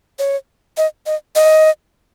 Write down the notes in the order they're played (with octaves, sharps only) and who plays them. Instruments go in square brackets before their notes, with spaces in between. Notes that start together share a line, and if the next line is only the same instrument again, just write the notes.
[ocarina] C#5
D#5
D#5
D#5